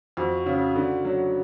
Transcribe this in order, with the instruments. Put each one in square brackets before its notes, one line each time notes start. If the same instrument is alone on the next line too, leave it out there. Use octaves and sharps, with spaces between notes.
[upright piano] F2 [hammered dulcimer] F#4
[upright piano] C#3
D3
F#3